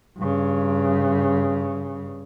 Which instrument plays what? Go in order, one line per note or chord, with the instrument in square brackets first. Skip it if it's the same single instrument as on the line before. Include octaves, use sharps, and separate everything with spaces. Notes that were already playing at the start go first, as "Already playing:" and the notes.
[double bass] G2 C#3